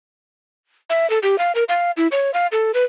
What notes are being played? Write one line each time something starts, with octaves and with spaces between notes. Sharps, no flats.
E5
A4
G4
F5
A#4
F5
E4
C#5
F5
A4
B4